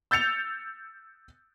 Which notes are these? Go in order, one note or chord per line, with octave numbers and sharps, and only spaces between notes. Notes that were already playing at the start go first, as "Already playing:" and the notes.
E6 G6 A6 C#7 F7